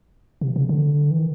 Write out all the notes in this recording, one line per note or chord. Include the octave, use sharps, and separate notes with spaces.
C3
C#3
D3
E3
D#3